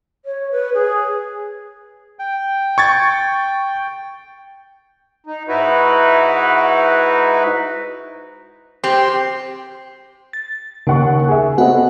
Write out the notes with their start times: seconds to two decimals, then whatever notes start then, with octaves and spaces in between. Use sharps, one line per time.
0.25 C#5
0.51 B4
0.74 G#4
2.19 G5
2.78 C#6 G#6 A6
5.26 D#4
5.48 G#2 D#4 E4 F#4 B4
8.84 C4 G4 C6
10.33 A6
10.87 D#2 C#3 F#5 C#6
11.28 G#4 E5
11.58 B3 C4 F#4 A4 D#5 F#5